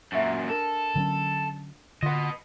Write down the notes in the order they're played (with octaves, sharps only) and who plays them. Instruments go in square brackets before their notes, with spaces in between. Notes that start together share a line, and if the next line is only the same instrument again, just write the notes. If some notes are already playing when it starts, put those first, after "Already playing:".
[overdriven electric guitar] F#2 A#2 [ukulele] F#4 E5 F#5
[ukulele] D4 A#4 [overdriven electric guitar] A4
[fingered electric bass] D3 F#3 C#4
[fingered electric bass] D3 [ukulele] F4 F#5 [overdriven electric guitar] B4 D#5